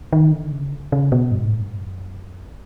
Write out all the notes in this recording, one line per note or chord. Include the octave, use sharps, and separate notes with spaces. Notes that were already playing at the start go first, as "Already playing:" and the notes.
D#3
D3
C#3
D3
C#3
B2
G2
G#2
A2
G2
F#2